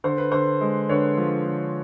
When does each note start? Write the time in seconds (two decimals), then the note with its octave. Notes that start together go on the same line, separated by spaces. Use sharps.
0.04 D3 C5
0.18 B4
0.32 D3 C5
0.61 G#3
0.89 D3 B4 C#5
1.17 F3
1.46 D3